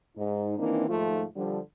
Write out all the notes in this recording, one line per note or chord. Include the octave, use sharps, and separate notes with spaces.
G#2 D#4
D#3 E3 A#3 C4 D4 D#4
D#2 G#2 F3 A3 F4
D3 F3 G3